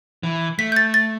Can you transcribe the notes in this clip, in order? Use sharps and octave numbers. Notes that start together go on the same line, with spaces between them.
E3
A3 B6
G6
A6
A6